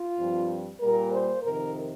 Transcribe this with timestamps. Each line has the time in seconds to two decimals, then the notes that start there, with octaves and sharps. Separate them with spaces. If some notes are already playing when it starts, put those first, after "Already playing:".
Already playing: F4
0.18 G2 F3 C4
0.80 A#2 G3 A#3 A#4
1.12 C5
1.43 F2 C3 D#3 A#4